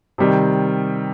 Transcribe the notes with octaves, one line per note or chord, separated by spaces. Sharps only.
C3 D#3 G3